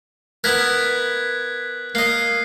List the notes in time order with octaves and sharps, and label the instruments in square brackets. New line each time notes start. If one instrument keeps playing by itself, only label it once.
[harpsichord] B3 E4 A#4 [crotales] F#6 G#6 B6
[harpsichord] A#3 D#5 [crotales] C7